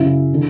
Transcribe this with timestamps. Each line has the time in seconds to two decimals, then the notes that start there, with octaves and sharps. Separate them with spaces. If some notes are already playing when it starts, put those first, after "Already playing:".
Already playing: F#2 C#3 F#3 E4
0.34 D3